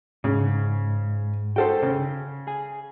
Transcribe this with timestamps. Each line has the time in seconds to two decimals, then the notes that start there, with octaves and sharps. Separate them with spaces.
0.24 G#2 C#3
1.56 F#4 G#4 A4 C5 G5
1.82 C#3
2.47 G#4 G#5